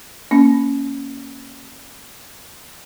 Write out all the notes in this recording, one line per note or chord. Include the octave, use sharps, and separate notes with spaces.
A#3 C#4